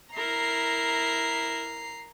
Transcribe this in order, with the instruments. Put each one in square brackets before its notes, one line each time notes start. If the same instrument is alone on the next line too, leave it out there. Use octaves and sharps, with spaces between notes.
[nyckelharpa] E4 A#4 [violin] A#5 C7